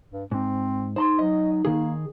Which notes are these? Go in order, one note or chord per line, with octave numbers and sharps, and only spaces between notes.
G2
G#2 C4
D#4 C5 A#5 C6
F#3 D#5
D#3 A#3 G#4